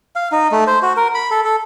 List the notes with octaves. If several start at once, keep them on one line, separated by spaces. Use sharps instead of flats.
F5
D#4
A3
C5
F#4
A#4
B5
A4
A4